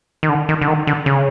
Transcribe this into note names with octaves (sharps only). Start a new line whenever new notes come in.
D#3
D3
D#3
D3
D#3
D3
C#3